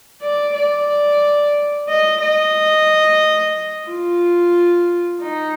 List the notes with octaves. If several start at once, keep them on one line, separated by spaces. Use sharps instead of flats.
D5
D5
D#5
D#5
F4
D#4